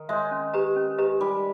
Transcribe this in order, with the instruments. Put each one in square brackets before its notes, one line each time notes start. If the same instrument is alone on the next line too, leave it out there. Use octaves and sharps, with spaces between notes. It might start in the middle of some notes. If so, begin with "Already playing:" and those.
Already playing: [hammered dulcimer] D#3
[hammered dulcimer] G#3 [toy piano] C#5 E5
[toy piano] C#4
G4 B4 D#5 A#5
C#4
G4 B4 D#5 A#5
[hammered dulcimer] G3 [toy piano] D#4